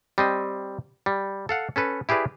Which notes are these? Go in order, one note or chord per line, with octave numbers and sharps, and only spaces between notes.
G3 C4 D#5
G3
A4 F5 F#5
C#4 A4 B4
E4 G4 G#4 B4 D5